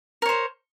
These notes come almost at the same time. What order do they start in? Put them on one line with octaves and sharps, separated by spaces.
A#4 C#5 C5